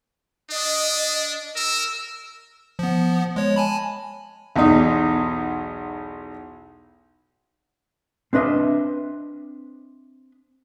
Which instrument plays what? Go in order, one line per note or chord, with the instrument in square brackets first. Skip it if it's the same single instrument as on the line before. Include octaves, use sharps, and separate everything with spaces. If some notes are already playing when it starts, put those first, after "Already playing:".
[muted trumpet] D4 [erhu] D#5
[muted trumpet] A#4 [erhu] E6
[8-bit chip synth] F3 B3
G#3 C#5
G#5 A5 B5
[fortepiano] B1 E2 D#4
[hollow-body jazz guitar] C4 D4 B4 D#5 E5